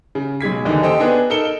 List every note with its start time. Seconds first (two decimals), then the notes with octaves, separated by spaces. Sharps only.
0.15 C#3
0.41 B1 G#3 G#6 B6
0.65 F#1 D#2 D3 E3 D#4
0.83 G4 A4 C5 D#5 G5
0.99 B3 D4 D#4 G#4 B4 D#5
1.30 D#4 A4 A#4 C#7 E7 G7